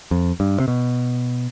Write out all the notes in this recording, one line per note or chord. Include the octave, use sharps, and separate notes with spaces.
F2
G2
C3
B2